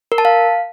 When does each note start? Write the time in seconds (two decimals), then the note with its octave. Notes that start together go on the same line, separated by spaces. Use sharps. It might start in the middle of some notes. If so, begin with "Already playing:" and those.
0.12 A#4
0.18 A5
0.25 F5